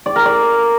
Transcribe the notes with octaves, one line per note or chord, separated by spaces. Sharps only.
D5
A#4
D5